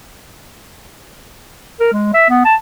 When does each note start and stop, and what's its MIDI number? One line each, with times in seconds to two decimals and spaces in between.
1.80 1.88 70
1.92 2.11 56
2.14 2.27 76
2.29 2.41 59
2.44 2.55 81